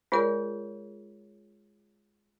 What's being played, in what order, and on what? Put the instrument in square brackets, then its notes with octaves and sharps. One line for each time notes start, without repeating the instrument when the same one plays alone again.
[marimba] G#3 A#4 D5 [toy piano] F4 G#4 C#5